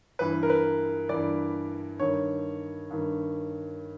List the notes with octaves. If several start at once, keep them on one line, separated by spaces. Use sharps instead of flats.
G2 E3 B4
A#4
B4
G2 E3 D5
G2 D#3 C#5
G2 D#3